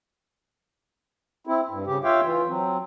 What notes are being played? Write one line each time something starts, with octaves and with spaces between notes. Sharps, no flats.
C4 E4
G2
C#3 G4
F4 C#5 E5 F5 G5
E3 F4
F#3 C4